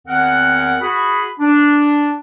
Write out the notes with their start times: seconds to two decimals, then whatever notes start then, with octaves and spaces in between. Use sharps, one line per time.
0.07 E2 D#3 C4 A#4 F#5
0.81 F#4 G#4 B5
1.40 D4